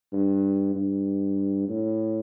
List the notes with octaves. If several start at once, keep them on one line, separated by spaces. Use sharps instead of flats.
G2
G2
A2